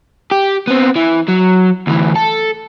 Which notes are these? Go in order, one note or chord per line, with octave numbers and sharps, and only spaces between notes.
G4
B3 C4
E3
F#3
D2 E3
A4